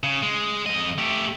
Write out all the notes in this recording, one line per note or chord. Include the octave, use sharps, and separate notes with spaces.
C#3
G#3
F2 D#5
A3 G4